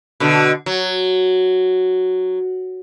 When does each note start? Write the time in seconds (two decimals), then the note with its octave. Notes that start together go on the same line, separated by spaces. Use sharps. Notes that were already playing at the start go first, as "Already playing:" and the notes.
0.20 B2 D3
0.66 F#3